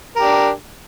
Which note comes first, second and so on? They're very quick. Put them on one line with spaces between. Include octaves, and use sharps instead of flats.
A#4 G4 D4